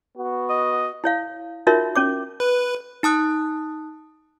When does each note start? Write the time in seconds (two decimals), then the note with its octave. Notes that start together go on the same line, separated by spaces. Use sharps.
0.17 B3 F#4
0.49 D#5
1.04 E4 C#5 F5
1.67 D#4 F4 F#4 A#4 C#5 E5
1.96 C#4 C#5 D6
2.40 B4
3.03 D#4 A5 D#6 F#6